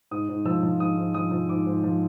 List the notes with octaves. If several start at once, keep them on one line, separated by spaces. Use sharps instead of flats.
G#2 D#6
G#2
F3 E6
F3
G#2 D#6
G#2
F3 D#6
F3
G#2 D6
G#2
F3